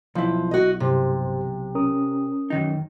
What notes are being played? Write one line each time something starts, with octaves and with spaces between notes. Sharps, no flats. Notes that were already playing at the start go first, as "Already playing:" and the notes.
B1 F3 E4
F#4 D#5
G2 C3 G4 C5
C#4 A#4 D#6
F#2 D#3 D#4